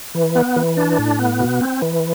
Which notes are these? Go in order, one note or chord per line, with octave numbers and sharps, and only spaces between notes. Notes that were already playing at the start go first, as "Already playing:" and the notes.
E3
B3
E3
D4
A2
B3
B2
C4
E3